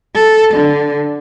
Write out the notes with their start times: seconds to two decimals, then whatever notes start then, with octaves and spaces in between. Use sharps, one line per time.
0.16 A4
0.56 D3